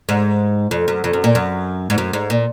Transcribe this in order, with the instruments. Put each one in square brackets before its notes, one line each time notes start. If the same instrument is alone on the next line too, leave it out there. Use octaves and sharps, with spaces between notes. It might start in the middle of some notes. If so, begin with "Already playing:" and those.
[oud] G#2
F2
F#2
F2
F#2
A#2
F#2
G#2
F#2
G#2
A#2